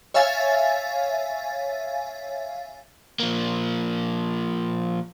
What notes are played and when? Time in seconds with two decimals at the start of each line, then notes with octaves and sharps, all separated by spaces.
0.14 C#5 E5 F5 G#5 A6
3.20 F3 A#3